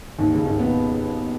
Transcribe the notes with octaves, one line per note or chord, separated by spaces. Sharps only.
D#2 D#3
C#2 C#3
D#2 D#3
B2 B3